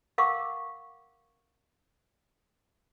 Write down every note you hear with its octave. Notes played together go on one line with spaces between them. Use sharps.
A#4 F5 F#5 C#6 D6